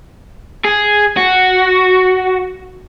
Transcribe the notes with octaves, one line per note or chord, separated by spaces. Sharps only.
G#4
F#4